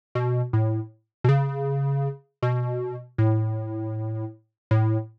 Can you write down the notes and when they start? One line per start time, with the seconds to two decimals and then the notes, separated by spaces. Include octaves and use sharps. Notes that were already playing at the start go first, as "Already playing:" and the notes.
0.15 B2
0.53 A2
1.24 B2
1.29 C#3
2.43 B2
3.18 A2
4.71 A2